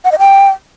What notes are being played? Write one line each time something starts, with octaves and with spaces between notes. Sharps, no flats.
F#5
D#5
G5